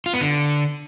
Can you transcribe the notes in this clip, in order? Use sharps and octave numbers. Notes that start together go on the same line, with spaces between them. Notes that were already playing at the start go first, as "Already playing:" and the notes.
F4
B3
D3